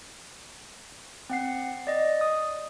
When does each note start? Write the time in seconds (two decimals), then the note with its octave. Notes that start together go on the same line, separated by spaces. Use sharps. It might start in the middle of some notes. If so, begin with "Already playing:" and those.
1.30 C4 F#5 C7
1.87 D5 D#5
2.21 D#6